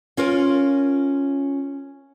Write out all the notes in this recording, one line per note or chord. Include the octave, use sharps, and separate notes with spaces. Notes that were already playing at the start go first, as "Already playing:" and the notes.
C#4 F4 A#4 C#5